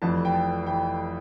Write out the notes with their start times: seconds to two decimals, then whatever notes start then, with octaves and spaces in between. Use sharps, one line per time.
0.02 F1 F2 E3 A5
0.25 G5
0.34 A5
0.67 E3 G5